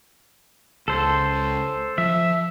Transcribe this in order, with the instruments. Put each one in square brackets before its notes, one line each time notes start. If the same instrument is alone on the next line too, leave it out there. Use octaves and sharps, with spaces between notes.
[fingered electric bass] C#2 [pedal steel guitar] A4 C5
[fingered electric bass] F3 [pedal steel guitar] E5